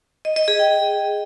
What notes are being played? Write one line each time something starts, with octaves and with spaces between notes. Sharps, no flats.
D#5
D#5
G#4
G5